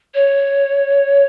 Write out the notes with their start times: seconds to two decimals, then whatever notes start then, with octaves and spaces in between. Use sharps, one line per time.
0.14 C#5